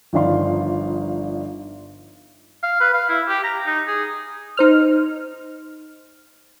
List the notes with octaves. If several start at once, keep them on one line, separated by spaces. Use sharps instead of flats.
G1 F3 D#4 D5 F5 C6
F5
B4
F5
E4
G4
A#5
D#4
G#4
D#4 C5 F6